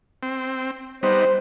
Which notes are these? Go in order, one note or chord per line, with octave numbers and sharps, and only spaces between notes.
C4
G3 B3 D#4 C5